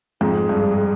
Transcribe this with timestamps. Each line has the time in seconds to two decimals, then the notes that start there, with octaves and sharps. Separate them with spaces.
0.21 F2 G#2 G#4
0.49 G2